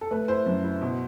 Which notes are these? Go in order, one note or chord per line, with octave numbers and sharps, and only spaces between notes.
A4
A3 B4
E4 C5
F#2
E4
B2